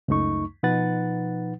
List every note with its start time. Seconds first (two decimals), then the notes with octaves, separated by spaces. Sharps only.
0.08 C#2 F#2 A3 D#4 C#6
0.63 B2 F3 D#4 B4 F#5 A6